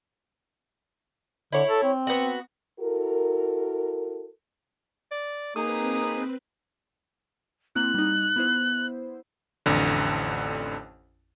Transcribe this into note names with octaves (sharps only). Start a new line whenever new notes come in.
D3 E4 C#5
A4
C4
B3 F#4
E4 F#4 A4 A#4
D5
A#3 C4 D#4 G#4 B4 D#6
A#3 C4 E4 F#6
G3 D#4
B3 E4 C5
A1 F2 D3